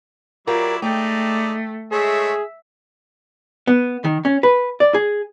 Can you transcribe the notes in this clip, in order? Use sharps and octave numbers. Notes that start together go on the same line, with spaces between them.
F#3 E4 F4 G4 A#4 D5
G#3 A3 D#4 D5 G5
G#3 A3 G#4 C#5 E5
B3
D#3
C#4
B4
D5
G#4